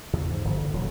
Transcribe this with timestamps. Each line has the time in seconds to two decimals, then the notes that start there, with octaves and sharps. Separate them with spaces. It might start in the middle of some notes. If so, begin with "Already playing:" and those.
0.13 E2 A2 C#3
0.30 G#2
0.44 G1 D2 F3
0.58 D3
0.73 D#1 A#2 F#3